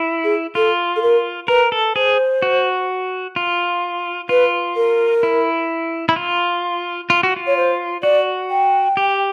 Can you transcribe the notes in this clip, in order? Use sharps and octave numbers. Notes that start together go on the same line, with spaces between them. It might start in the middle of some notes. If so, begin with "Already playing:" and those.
Already playing: E4
G#4
F4 A4
A4
A#4
A#4 B4
A4
G#4 C5
F#4
F4
F4 B4
A#4
E4
E4
F4
F4
F#4
F4
C#5
C5
F#4 D5
G5
G4